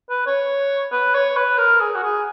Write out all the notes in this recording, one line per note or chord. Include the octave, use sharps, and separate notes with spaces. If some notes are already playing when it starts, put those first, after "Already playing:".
B4
C#5
B4
C#5
B4
A#4
G#4
F#4
G#4